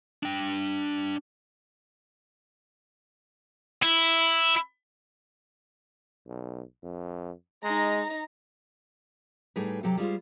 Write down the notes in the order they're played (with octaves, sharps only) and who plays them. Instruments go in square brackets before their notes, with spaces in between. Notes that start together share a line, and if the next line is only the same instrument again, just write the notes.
[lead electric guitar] D4 G5
[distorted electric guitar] E4
[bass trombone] B1
F2
[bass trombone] G#3 [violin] D#4 A#5
[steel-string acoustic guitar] A2 G3 D#4 G#4 B4
C3 F#3 G4 A4
G3 G#3 F4 C5